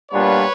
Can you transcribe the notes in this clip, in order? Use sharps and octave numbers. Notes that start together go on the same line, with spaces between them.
A#2 G3 B3 D4 F4 B4 C#5